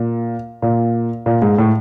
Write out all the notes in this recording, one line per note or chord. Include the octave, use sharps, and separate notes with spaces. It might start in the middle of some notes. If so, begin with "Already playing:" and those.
Already playing: A#2
A#2
A#2
G#2
A2